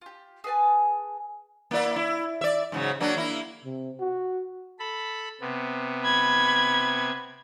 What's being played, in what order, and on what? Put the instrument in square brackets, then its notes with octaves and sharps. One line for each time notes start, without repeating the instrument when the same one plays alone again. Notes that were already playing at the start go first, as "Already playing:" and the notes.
[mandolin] F4 G4
G#4 B4 G#5 A5
[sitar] A#3 E4 D5
E4
D5 E5
G#2 C#3 F#3
F#3 A#3 D4
A#3 E4
[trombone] C3
F#4
[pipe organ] A4 B5
C3 B3
[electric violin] B5 G#6